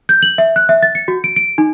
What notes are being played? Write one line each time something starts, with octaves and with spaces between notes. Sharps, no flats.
G6
F#7
E5
F#6
E5
A6
C#7
F#4
D7
D7
D#4